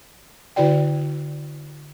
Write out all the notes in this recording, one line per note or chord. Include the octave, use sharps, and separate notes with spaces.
D3 E4 F#4 D5 G5